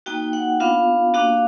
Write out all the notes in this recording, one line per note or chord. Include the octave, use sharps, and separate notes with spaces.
A#3 D#4 F#4 G5
F#5
B3 D4 F4 F5
A#3 D4 F#4 F5